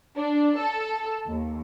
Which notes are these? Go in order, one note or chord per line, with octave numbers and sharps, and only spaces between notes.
D4
A4
D#2